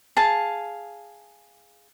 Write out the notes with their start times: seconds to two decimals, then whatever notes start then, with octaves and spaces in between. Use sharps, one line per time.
0.17 G#4 F5 A5